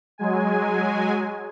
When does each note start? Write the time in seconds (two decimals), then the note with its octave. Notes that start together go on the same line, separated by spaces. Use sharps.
0.18 F#3 G#3 G#5